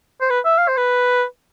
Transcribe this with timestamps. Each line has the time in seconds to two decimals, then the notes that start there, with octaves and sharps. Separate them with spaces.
0.21 C5
0.30 B4
0.45 E5
0.58 F5
0.68 C5
0.77 B4